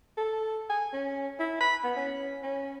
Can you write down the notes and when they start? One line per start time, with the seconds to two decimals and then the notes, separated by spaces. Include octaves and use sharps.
0.17 A4
0.70 G#5
0.93 C#4
1.39 E4
1.60 B5
1.84 B3
1.96 C#4
2.42 C#4